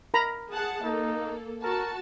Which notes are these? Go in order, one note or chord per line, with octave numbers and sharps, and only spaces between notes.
A#4 A#5 B5
G#4 F#5 A5
A#3 D#4 A4
F#4 A#4 A5